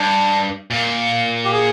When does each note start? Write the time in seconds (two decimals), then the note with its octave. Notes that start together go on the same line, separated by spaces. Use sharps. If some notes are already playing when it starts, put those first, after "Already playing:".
Already playing: G2 D4
0.71 A#2
1.45 G4
1.52 G#4